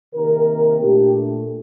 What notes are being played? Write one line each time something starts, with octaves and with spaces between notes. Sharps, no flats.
C3 D#3 A#3 A#4
A#2 A3 D4 G4